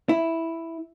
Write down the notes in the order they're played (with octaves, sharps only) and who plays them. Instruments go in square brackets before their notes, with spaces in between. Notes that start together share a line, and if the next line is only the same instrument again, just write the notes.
[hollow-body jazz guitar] E4